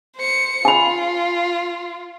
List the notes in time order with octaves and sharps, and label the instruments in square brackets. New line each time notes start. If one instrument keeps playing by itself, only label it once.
[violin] C5 C#7
[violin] F4 [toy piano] G#5 B5